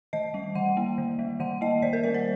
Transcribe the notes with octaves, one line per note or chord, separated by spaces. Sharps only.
D#3 D#5
G3
D#3 F#5
A#3
D#3
G3
D#3 F#5
A#3 D#5
D#3 D5
A#4
G3 D5
C5